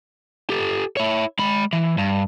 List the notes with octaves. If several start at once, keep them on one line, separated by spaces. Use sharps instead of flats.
G4 A4
E4 C#5
G#3 B5
E3
G2